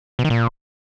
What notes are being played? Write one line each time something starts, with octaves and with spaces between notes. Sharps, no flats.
B2
D#3
A#2